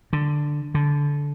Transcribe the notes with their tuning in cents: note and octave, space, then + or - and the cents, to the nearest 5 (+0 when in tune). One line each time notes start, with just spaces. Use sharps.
D3 +5
D3 -20